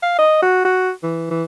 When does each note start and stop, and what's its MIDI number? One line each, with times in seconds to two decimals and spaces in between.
0.02 0.13 77
0.18 0.40 75
0.42 0.62 66
0.65 0.91 66
1.03 1.28 52
1.30 1.44 52